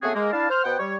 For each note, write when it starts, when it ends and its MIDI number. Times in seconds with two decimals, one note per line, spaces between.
0.03 0.11 49
0.03 0.11 57
0.03 0.11 59
0.03 0.11 60
0.03 0.11 66
0.03 0.11 68
0.15 0.31 56
0.15 0.31 58
0.32 0.49 62
0.32 0.49 64
0.32 0.49 77
0.32 0.49 81
0.50 0.62 72
0.50 0.62 89
0.64 0.75 47
0.64 0.75 59
0.64 0.75 72
0.64 0.75 78
0.64 0.75 79
0.79 0.96 55
0.79 0.96 73